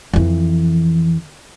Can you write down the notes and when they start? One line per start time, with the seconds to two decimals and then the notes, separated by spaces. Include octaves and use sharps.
0.13 F2 E3